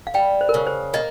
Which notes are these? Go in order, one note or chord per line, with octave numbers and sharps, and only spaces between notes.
F5
G3 G5
C5
A#4
C#3 C5
C5
A#3 D#5